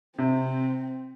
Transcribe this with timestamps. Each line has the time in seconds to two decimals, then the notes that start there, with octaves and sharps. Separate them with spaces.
0.18 C3 C4